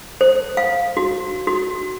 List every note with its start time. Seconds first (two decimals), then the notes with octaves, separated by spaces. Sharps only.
0.21 C5
0.57 F5
0.97 F#4
1.47 F#4